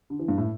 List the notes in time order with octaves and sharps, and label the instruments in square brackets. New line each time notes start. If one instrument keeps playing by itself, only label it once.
[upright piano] D3
E3
G2
A2